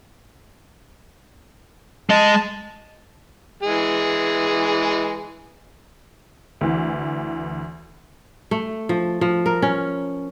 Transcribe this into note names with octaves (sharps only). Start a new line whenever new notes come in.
G#3 D#5 A5
E3 G#3 G#4
D2 E3
A3
F3
F3
A#4
C#4